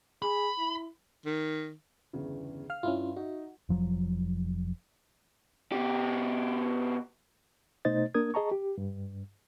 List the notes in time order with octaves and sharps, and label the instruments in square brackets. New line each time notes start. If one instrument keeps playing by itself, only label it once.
[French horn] G#4 [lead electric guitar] B5
[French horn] E4
[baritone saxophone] D#3
[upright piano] G1 E2 C#3
[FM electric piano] F5 F6
[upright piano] G2 [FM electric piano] C#4 E4 F4
[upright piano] D#4 E5 [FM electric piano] F#4
[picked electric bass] F1 F3 F#3
[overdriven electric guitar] B2 G4
[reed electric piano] B2 A3 D#4 C5 D#5 A6
A#3 D4 A#4 D#6 G#6
G#4 D#5 A5 A#5 C#6
G4
G2